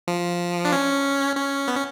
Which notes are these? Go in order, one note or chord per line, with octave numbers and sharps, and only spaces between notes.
F3
D4
C#4
C#4
B3
C#4